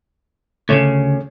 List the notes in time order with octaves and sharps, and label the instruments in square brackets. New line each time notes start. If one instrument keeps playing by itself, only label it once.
[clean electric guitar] D2 A2 C#3 [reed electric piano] A3 C#5